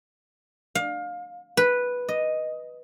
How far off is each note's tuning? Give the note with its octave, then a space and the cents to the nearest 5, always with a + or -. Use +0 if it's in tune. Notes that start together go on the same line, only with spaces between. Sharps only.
F5 +25
B4 -5
D#5 +0